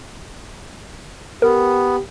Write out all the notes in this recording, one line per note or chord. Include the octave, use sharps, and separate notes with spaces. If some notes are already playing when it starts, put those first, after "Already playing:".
B3 G4 A#4